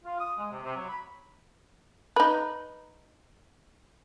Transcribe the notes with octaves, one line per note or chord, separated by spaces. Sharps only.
F4
D#6
G#3
C3
C3
F#3
B5
D#4 B4